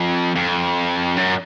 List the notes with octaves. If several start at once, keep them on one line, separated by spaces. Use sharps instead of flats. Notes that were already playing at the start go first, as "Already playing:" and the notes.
Already playing: F2
F2
F#2